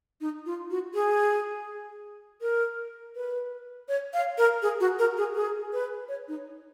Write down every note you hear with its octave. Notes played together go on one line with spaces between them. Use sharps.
D#4
F4
F#4
G#4
A#4
B4
C#5
F5
A#4
G#4
F#4
A#4
G#4
G#4
B4
C#5
D#4